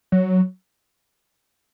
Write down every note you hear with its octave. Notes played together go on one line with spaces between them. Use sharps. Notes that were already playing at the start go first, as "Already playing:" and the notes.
F#3